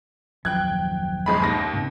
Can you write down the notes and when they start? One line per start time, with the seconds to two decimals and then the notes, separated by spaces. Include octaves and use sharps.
0.45 D#1 F#2 F3 G5 F#6 G#6
1.26 G1 G#3 B5
1.42 D#2 A#6
1.73 G#2 C#3 C4